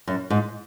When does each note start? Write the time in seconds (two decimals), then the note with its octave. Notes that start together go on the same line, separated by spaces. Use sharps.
0.08 F#2
0.30 G#2